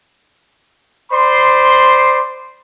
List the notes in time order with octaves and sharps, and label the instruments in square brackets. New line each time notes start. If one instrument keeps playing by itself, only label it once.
[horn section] C5 D5 B5 C6